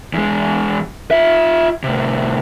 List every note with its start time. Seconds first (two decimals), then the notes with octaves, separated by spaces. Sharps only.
0.14 E2 G#3
1.11 F4 E5
1.84 A2 C3